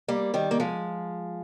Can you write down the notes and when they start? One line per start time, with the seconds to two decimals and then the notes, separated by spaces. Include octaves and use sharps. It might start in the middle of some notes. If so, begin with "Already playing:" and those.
0.08 G3 A#3
0.34 D#3 G3
0.51 A#3
0.60 F3 G#3